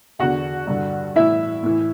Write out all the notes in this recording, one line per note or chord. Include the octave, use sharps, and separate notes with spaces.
E2 D3 F#4 F#5
G2 D3
A2 E3 E4 E5
A2 E3